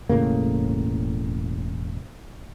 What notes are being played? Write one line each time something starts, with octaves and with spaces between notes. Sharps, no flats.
E1 A2 C#3 A#3